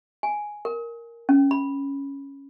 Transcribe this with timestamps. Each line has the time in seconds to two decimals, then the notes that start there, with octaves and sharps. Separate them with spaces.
0.23 G#5
0.65 A#4
1.29 C#4
1.51 B5